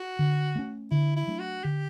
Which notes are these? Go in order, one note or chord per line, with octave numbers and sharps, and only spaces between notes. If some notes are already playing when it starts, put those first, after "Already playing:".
Already playing: F#4
D3
A3 C#4
D3 E4
E4
F#3 A3 D4
F#4
D3 G4